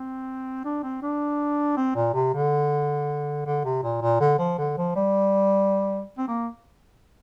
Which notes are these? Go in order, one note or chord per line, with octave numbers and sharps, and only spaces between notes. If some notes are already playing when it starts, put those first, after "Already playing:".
Already playing: C4
D4
C4
D4
C4
A#2
C3
D3
D3
C3
A#2
A#2
D3
F3
D3
F3
G3
C4
A#3